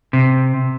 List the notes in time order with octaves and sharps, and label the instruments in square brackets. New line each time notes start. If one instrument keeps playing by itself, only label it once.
[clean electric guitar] C3